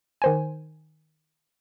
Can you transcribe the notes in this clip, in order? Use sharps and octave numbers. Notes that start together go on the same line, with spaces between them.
D#3 C5 G#5